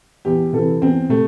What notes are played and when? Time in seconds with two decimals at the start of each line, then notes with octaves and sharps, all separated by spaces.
0.25 E2 G4
0.53 C3 E3 A4
0.82 E2 C4
1.09 C3 A3